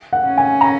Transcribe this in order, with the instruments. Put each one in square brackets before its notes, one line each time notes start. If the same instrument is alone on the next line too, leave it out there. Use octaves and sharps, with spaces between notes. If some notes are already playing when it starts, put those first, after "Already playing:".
[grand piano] F#5
[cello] C#4
[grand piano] G#5
A#5